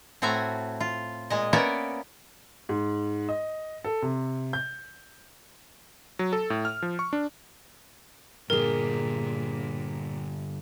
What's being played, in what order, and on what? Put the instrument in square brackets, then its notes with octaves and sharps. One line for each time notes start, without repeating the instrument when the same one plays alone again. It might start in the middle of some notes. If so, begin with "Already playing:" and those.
[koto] A2 A3 C4 F#4 G#5 A#5
F4
A#2 G#3 D#5
A#3 B3 C#4 A#4 D5 E5
[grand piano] G#2
D#5
A4
C3
G6
[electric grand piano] F#3
A4
A2
F6
F3
C#6
D4
[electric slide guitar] G2 D3 [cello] A#2 [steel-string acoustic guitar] G#4 A#5 [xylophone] A#4